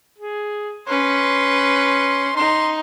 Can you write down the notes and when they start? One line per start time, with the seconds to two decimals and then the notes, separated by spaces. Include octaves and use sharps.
0.18 G#4
0.88 C#4 B4 C6
2.37 D#4 C6